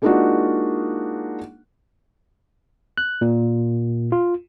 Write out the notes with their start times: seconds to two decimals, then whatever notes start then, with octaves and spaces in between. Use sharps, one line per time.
0.02 G#3 A#3 D4 D#4 F4 F#4
2.98 F#6
3.21 A#2
4.12 F4